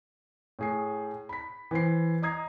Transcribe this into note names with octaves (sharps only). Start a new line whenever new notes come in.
A2 G#4 C7
B5 B6
E3 C5 C7
D#5 A#5 D#6 G#6 C7